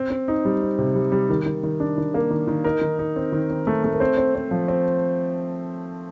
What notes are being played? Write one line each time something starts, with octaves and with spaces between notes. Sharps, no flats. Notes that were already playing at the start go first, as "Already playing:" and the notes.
Already playing: C4
C4
D#4
G3
C4
C3
G3
G3
D#3
D#3
D#3
D4
D#3
A#3
D#3
D#3
D#4 A#4
D#3
D#4
C4
D#3
C4
A3
A3
A#4
C4 C5
C4
C4
F3
C4